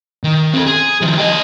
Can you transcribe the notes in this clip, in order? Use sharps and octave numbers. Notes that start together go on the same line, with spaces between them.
D#3
C4 A4
G#4
D#3 F3
G4 D#5